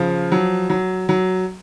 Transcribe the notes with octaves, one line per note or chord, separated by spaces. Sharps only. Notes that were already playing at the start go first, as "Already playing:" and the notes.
Already playing: C#3 F3
F#3
F#3
F#3